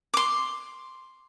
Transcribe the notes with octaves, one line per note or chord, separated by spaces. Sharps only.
C6 D6